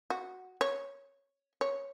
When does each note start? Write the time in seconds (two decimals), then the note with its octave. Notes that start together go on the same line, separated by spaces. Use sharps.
0.10 F#4
0.61 C#5
1.61 C#5